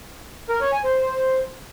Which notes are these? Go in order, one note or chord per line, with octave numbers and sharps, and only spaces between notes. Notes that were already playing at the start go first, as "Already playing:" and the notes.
A#4
C#5
G#5
C5